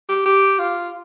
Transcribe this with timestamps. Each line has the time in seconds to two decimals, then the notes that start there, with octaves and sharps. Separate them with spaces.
0.09 G4
0.25 G4
0.59 F4